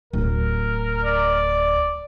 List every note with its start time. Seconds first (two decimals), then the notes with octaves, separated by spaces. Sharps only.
0.13 D1 A#4
1.04 D5